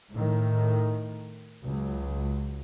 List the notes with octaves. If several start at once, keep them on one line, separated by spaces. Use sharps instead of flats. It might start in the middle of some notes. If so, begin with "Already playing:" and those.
A2 D#3
C#2 F#3